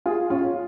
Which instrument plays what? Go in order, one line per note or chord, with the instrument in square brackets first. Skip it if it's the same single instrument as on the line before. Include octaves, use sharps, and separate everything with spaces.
[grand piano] F4 G#4
C#4 F4